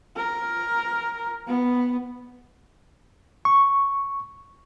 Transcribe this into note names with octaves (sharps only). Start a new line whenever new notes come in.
A#4
B3
C#6